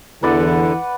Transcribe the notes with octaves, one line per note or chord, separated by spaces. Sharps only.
E2 D3 E3 B4 D5 F#5